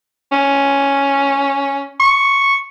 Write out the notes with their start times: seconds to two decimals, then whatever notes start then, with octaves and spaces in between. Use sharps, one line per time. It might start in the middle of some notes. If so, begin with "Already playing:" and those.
0.32 C#4
2.00 C#6